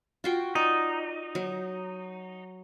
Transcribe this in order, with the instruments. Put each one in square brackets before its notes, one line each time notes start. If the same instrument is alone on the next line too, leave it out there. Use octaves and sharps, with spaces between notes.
[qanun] F4 F#4 G5
[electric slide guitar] D#4 [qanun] D5
[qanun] F#3